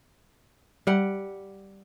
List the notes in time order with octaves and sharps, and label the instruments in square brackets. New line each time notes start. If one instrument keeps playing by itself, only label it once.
[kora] G3 F#5